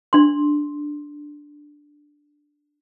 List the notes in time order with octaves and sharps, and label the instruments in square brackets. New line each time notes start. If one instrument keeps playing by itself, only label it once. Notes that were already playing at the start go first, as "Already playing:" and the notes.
[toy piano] D4 C6